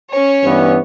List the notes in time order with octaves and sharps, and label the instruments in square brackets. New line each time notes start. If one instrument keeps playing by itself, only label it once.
[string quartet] C#4 C#5
[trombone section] G2 E3 B3